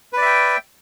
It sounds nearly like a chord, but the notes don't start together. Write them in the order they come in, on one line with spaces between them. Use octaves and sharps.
B4 D5 E5 G5